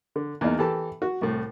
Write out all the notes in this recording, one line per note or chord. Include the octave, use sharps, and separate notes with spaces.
D3
E2 A#3 B3 D#4
E3 G4 A4 A5
F#4
C2 A2